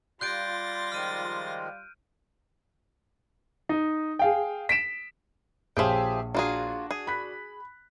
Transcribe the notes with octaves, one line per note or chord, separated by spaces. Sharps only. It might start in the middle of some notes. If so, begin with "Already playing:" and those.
G3 F4 C6 F#6 G6 A6 A#6 D7
D#3 F3 G#3 F6 D#7
D#4
G#4 F5 G5
B6 D7 E7
A#1 F3 G4 G#4 C#5 E5 G5
A#3 D4 F4 F#4 G#4
G#4
B5 F#6 B6